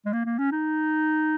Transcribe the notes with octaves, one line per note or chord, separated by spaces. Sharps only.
G#3
A#3
A#3
C#4
D#4